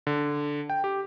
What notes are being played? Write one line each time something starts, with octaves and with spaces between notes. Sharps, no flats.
D3
G5
G4